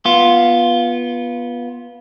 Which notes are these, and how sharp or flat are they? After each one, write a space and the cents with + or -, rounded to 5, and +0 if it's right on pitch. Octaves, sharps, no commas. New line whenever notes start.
B3 -15 F4 +0